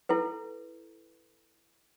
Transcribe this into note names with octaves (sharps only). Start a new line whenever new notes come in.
E4 A4 B4